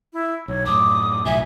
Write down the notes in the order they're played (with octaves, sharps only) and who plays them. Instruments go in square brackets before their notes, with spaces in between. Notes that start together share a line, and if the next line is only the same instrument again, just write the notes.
[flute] E4
[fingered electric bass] B1 [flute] C#5
[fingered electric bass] F#2 A2 [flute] D6 [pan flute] D#6
[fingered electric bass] E1 B1 A2 [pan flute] E5 [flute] G#5